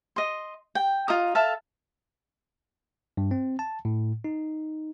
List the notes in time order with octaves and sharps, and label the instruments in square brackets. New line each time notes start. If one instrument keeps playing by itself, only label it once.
[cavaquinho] D#5 C6
G5
F4 D#5 A#5 D#6
A4 E5 F5 A5
[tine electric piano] G2
C4
A5
A2
D#4